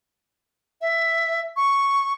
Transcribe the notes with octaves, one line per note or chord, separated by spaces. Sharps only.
E5
C#6